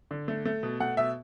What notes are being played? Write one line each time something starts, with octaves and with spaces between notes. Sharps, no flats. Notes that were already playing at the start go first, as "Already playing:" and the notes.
D3
A3
A3
B2
A3 F#5
B2 E5